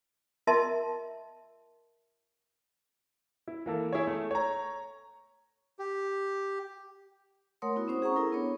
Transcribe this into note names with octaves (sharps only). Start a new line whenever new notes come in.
F4 A#4 D#5 E5 A5 C6
E4
E3 A#3 A4
E4 G#4 C#5
A3
C#5 A#5
G4
A3 A#4 C#5 F#5 C6 D#6
B3 E4 F#4
C4 C#4 C5 D#6
G#4 F#5 A#5 C#6
E4 A4 A#4
B3 D4 C#5